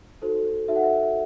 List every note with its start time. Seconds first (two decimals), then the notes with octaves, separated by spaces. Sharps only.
0.22 D#4 F#4 A4 C5
0.68 D#4 F#4 A4 C5 E5
0.76 F#5
0.83 E5